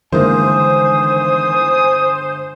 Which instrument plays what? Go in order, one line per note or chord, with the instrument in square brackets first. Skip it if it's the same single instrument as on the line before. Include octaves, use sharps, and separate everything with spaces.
[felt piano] G1 G#3 A#3 [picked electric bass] D#3 E3 [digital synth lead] C5 [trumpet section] G#5 D#6